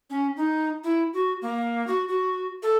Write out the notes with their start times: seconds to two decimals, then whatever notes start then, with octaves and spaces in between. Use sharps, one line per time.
0.10 C#4
0.37 D#4
0.84 E4
1.13 F#4
1.42 A#3
1.87 F#4
2.08 F#4
2.63 A4